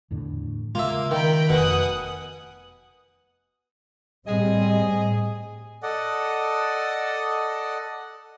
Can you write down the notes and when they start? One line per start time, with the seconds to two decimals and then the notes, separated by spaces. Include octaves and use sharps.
0.11 E2 A2 D3
0.75 C#3 G#3 A#3 F4 E5
1.11 D#3 G5 A#5 B5
1.50 F1 B2 F#5 G#5 D#6
4.26 A2 G3 C4 G#4 D#5
5.83 A4 D5 D#5 F#5